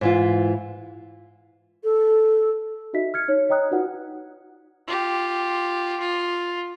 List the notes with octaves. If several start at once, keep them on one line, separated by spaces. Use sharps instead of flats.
G#2 E3 F4
A4
D#4 F#4 D#5 E5 B6
F6 G#6 C#7
D#4 C#5
C#5 D#5 G5 A#5 D#6 F#6
D#4 F4 F#4 B4 D5 F#5
F4 G4
F4